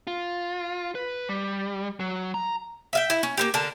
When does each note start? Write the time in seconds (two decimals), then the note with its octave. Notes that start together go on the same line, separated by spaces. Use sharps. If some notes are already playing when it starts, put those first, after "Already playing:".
0.07 F4
0.95 B4
1.29 G3
2.00 F#3
2.34 A#5
2.93 E5 F5 G5
3.10 E4
3.23 C#4
3.37 A#3 C4 G4
3.54 D3 A#4 A5